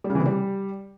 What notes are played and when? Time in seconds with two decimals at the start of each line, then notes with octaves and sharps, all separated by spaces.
0.04 G3
0.10 C#3
0.15 E3
0.20 C3
0.26 G3